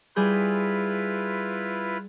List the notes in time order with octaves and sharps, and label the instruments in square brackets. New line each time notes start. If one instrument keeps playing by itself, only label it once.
[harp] G3 G#4 G6 [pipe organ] E4 F4 B4